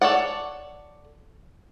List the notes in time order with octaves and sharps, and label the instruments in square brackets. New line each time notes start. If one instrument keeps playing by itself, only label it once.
[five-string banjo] A4 C#5 D5 F#5